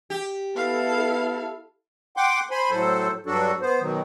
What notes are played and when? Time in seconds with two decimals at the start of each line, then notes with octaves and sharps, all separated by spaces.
0.10 G4
0.57 B3 E4 A4 F5
2.17 F#5 G5 C6 D6
2.51 C5 G#5 B5 C6
2.71 A2 F#3 A4 C5
3.26 G2 F#3 D4 F#4 A4
3.62 B3 C5
3.81 B2 D#3 F#3